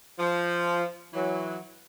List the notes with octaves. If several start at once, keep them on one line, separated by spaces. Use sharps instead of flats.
F3
E3 F#3